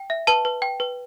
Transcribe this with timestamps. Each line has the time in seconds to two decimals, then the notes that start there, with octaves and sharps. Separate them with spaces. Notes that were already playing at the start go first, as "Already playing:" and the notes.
Already playing: G5
0.10 E5
0.27 B4 A5
0.45 B4
0.62 G5
0.80 B4